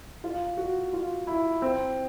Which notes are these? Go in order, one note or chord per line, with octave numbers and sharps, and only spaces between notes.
F4
F#4
F4
E4
C4